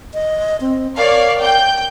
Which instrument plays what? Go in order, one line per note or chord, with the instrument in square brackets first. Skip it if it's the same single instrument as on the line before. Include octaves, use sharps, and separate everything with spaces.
[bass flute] D#5
C4
[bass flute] A#4 [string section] C#5 D5 F5
[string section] G5 G6